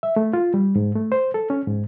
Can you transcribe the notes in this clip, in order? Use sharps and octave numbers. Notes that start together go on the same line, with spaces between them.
E5
A3
F4
G3
G#2
A3
C5
A4
C#4
G#2